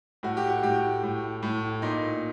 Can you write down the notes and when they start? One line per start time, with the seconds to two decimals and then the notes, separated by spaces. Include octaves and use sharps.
0.23 A2 F#4
0.37 G4
0.49 F#4
0.63 A2 G4
1.03 A2
1.43 A2
1.82 A#2 D#4